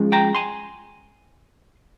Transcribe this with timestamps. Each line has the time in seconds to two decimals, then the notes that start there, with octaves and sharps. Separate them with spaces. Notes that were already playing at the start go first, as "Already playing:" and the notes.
Already playing: F3 G#3 C#4
0.12 G5 A#5
0.35 G#5 C6